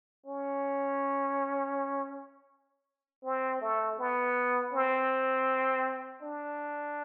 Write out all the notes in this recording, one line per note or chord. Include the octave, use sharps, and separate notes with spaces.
C#4
C4
A3
B3
C4
D4